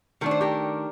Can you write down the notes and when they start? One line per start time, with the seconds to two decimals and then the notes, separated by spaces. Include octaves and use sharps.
0.21 D#3 A3 D4 A#4
0.31 C5
0.41 G4 A#4